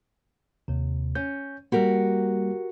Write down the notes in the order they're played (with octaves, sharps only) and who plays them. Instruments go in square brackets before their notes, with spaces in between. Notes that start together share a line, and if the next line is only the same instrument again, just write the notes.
[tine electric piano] D#2 C3
[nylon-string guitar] C#4 [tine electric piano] G6
[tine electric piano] G3 A#3 [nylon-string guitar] F#4 G4 A#4